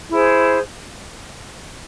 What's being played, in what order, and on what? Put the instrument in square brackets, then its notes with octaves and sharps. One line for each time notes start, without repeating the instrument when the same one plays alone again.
[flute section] E4 G#4 C5